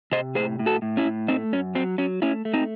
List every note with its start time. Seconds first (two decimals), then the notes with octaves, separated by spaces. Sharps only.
0.12 C3 C5 D#5
0.35 A2 G#4 C5
0.59 A2
0.66 F#4 A4
0.82 A2
0.97 C#4 E4
1.05 A2
1.28 A3 C4 D#4
1.53 F#2 C#4
1.75 F#3 C4
1.98 F#3 C#4
2.22 A3 C#4 E4
2.45 A3
2.54 C4 D#4